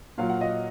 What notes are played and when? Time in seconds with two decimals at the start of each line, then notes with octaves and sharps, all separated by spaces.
0.18 A#2 F#3 F5
0.30 F#5
0.41 D#5 F5